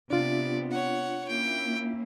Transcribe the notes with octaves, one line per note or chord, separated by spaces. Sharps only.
C3 B3 D4 F4 D5
C#5 F#5
A#3 C#4 E4 G5